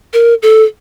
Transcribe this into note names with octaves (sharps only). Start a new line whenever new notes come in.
A#4
A4